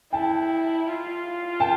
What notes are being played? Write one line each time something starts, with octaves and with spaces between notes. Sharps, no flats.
E4 G5 A5
F4
G5 A5